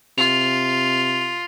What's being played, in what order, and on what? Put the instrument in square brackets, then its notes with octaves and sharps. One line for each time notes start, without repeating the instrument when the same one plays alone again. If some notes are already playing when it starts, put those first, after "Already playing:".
[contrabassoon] C3 [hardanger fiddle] F4 [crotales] F7